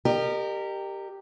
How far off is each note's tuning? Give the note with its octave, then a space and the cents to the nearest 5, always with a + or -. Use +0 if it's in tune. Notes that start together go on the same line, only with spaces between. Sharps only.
G4 +0 A#4 -20 D#5 -40